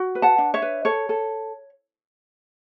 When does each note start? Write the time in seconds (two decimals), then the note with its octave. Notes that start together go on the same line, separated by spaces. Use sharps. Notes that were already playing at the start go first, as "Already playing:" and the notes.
Already playing: F#4
0.15 B4
0.22 F#5 A5
0.38 D4
0.54 C#5 E5
0.62 B4
0.85 A4 C#5
1.09 A4